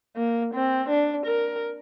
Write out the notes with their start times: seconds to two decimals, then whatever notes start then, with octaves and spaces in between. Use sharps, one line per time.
0.17 A#3
0.54 C4
0.89 D4
1.26 A#4